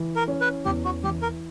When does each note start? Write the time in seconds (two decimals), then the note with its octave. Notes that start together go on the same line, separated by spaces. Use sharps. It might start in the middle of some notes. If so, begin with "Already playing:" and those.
Already playing: E3
0.16 A#4
0.28 C#4
0.41 B4
0.65 E2 G4
0.85 F#4
1.04 E3 G4
1.22 A#4